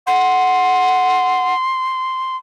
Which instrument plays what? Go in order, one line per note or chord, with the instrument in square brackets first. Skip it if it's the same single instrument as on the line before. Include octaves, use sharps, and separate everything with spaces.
[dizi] F#5 [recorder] C6